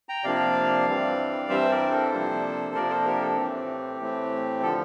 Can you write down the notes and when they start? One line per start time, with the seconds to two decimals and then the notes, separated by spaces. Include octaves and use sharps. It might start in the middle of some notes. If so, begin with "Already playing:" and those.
0.09 G5 A#5
0.24 C3 F3 A#3 D4 D5 F5
0.87 G2 E3 G3 C4
1.49 G2 E3 G3 C4 C5 E5
1.71 A#4 D5
1.91 A4 C5
2.12 C3 F3 A#3 D4
2.75 C3 F3 A#3 D4 A#4 D5
2.90 A4 C5
3.06 G4 A#4
3.21 A4
3.37 A2 E3 A3 C4 G4
3.99 A2 E3 A3 C4
4.62 D3 F3 A4